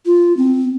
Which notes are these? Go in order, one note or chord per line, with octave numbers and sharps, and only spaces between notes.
F4
C4